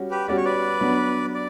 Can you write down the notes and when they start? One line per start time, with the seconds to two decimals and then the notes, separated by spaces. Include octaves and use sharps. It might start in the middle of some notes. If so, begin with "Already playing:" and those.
Already playing: G3 C#4 F#4
0.11 G4 B4
0.28 G3 C#4 F#4 D5
0.37 C#5
0.45 B4 D5
0.81 F#3 B3 D4
1.34 D5